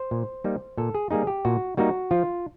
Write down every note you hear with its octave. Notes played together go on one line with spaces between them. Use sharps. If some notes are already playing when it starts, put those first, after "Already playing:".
Already playing: C5
A#2
G3 A#3 D#4
A#2 A4
G#4
G3 A#3 D#4 G#4
G4
A#2 F#4
G3 A#3 D#4 F#4
F3 F4